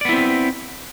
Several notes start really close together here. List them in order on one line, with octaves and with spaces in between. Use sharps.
D5 B3 E4 C4